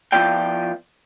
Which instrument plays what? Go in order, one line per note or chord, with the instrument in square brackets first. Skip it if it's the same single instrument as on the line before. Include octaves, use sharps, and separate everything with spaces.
[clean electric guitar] F3 B3 E4 F4 D5 G5